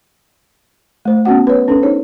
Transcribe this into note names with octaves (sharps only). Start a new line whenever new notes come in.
A3 C5
B3 C#4 F#4 F#5
B4 C#5
C#4 D4 A4 B4
D#4 G#4 C5 C#5